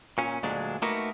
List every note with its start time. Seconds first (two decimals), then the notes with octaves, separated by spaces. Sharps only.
0.18 A#2 C#4
0.43 D2 A#2 F#3 G#3 D4
0.82 A3 A#3 D#4 F#4 A#4 B4